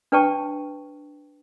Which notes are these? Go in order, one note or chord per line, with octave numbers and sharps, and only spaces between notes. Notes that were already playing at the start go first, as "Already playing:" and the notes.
D4 B4 C#5 G5 A5 C#6